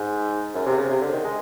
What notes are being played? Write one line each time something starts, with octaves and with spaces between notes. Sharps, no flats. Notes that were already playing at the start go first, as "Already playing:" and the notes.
Already playing: G#2
F#2
C3
C#3
C3
D3
D#3
G#3